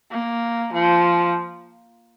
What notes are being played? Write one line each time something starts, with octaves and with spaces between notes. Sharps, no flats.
A#3
F3